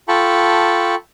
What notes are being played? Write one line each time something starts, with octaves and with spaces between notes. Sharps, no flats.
F4 A4 G5 A5 B5 C#6